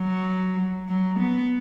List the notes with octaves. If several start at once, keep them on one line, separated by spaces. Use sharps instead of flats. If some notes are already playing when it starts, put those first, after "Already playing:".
Already playing: F#3
F#3
B3